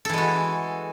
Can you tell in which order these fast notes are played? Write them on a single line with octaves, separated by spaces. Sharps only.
A4 E3 G#3 F#4